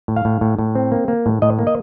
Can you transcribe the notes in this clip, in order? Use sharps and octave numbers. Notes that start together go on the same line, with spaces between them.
A2
F5
A2
A2
A2
C4
A#3
A#3
A2
A2 D#5
A#3
D#5